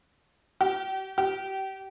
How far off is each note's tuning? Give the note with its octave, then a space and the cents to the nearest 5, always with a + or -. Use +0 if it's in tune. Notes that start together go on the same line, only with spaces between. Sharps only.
G4 -40
G4 -30